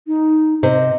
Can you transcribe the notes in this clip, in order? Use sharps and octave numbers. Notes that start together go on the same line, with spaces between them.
D#4
C3 C5 D#5